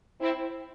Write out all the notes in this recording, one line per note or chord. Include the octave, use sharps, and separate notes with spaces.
C4 E4